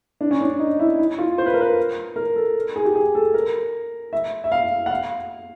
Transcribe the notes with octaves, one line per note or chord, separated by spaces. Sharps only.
D4
C#4
D4
D#4
E4
E4
F4
C5
B4
A#4
B4
A#4
A4
G#4
G4
G#4
A4
A#4
E5
E5
F5
F#5
F5